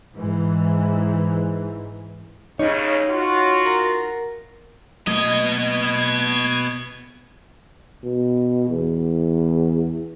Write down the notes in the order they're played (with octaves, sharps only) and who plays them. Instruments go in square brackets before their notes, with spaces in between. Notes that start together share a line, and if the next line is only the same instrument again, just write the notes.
[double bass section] G#2 E3
[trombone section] D#2 C#3 [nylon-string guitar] D#4 [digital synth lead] C#5
[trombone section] F4 F#4
[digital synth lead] A#4
[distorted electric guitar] B2 D#5 [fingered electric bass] F#3 A3 A#3 [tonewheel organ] G#6
[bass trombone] B2
E2